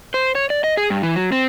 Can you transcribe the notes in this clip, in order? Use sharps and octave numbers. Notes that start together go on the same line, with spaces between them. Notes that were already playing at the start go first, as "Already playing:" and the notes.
C5
C#5
D5
D#5
G#4
G2
E3
F#3
C4